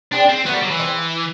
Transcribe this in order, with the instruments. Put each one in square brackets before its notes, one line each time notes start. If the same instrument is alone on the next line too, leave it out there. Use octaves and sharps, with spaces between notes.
[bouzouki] G3 C4 F4 G#4 [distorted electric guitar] D4
[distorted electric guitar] C4
[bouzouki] F#3 A3 C#4 F#4 [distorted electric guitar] B3
[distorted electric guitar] G3
F#3
E3
[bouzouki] G#3 C4 F4